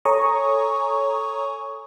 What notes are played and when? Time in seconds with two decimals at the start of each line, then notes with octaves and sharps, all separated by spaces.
0.05 A4 C#5 G#5 A#5 C#6 D#6